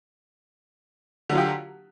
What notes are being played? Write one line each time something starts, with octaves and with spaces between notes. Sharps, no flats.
D3 F#3 F4 G4